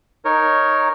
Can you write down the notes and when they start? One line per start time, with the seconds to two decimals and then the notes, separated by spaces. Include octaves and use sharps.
0.25 D#4 A#4 C#5